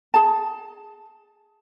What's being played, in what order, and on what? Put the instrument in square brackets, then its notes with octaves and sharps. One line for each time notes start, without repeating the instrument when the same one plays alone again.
[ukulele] G#4 A5